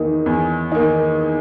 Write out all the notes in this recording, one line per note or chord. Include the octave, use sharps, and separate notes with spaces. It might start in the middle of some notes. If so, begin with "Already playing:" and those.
Already playing: E2 D#3 A#3 D#4
E2
D#3 A#3 D#4